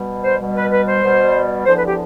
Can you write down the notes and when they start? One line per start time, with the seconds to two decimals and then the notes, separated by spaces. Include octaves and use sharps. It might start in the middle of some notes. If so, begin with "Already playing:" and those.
Already playing: B2 G3
0.23 C5
0.40 B2 G3
0.55 B4
0.71 B4
0.87 C5
1.02 B2 G3
1.65 E2 D3 F3 C5
1.77 B4
1.87 G4